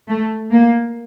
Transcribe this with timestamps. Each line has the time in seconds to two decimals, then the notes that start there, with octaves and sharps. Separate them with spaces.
0.09 A3
0.52 A#3